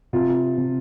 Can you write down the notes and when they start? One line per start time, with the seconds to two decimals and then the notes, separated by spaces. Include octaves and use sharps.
0.13 C3 F4
0.57 C3